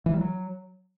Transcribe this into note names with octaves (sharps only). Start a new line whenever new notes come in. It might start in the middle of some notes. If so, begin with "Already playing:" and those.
E3
G3
F#3